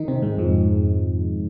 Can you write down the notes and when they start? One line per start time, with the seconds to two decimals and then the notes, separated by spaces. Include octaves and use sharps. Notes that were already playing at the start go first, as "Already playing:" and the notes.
Already playing: D#3 D#4
0.08 C3 C4
0.22 G#2 G#3
0.38 F2 F3